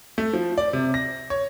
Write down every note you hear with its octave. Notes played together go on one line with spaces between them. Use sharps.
A3
F3
D5
C3
A#6
C#5